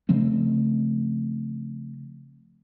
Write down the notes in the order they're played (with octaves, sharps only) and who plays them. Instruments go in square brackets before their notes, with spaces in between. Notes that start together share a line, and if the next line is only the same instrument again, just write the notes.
[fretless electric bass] C#3 F3 A3 C4